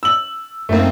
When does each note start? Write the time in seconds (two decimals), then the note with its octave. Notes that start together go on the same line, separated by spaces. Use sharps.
0.03 E6 F#7
0.69 F#2 A3 A#3 C4 D#4